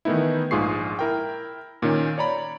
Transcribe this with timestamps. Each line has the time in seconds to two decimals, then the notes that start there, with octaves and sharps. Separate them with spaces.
0.05 D#3 E3 A3 B3 D#4 E4
0.51 A#1 G#2 F4 G#4 C#6 C7
0.99 E4 A#4 G5
1.82 A#2 D#3 C#4
2.18 C#5 D5 A#5 B5